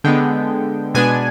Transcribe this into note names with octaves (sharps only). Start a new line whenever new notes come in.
D3 G#3 B3 G5
B2 G#3 B3 D4 G#5